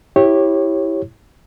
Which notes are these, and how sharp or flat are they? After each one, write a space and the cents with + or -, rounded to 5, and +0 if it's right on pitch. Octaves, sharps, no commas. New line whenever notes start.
E4 -5 G4 +0 C#5 -20